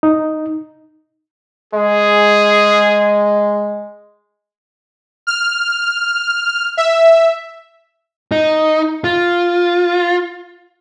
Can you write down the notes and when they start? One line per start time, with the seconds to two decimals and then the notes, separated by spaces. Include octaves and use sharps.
0.03 D#4
1.74 G#3 G#4
5.27 F6
6.77 E5
8.32 D#4
9.04 F4